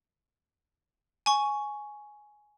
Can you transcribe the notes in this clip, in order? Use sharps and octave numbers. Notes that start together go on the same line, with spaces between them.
G#5 C#6